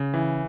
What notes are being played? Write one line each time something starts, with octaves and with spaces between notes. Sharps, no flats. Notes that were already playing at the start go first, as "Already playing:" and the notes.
Already playing: C#3
E3